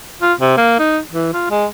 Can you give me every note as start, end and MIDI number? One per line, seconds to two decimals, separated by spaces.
0.21 0.33 65
0.40 0.53 48
0.57 0.74 58
0.79 0.99 63
1.12 1.31 52
1.33 1.47 65
1.50 1.66 56